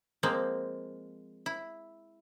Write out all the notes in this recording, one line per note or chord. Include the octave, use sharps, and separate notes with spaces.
F3 G#3 A#3 C4
E4